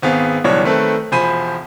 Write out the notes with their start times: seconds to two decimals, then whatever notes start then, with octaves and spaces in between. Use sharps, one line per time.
0.02 G#1 B3 C4 G#4 F5
0.44 F#1 B2 E3 G3 D4 C#5
0.64 D#3 A3 C4 A4 B4
1.12 E1 F3 C5 G#5 B5 D#7